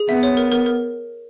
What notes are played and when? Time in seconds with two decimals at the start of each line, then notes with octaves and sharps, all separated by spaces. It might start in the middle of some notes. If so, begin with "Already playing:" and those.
Already playing: G#4
0.09 B3 E5
0.23 C#5
0.37 A#4
0.52 A#4
0.66 A#4